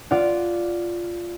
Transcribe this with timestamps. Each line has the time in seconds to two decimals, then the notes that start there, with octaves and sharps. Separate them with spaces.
0.11 F4 D5 F5 F#5